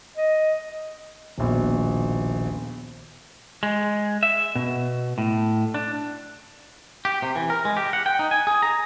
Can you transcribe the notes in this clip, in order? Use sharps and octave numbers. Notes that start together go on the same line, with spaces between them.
D#5
D#1 A#1 B2
G#3
E5
B2
A2
D4
G4
C3
E3
A#4
G#3
G4
F#5
G5
D#4
G#5
G#4
A#5